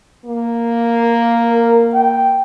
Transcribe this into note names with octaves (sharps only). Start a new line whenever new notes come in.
A#3
A#4
G5